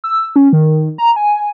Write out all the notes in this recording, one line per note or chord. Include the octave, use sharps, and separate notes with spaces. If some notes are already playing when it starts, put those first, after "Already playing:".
E6
C#4
D#3
A#5
G#5